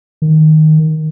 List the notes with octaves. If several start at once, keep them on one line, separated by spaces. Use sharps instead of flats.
D#3